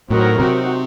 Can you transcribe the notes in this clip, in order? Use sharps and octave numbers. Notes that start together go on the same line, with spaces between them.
A2 F#3 C4 D#4 F#4 A#4
C3 C4 D#4 F#4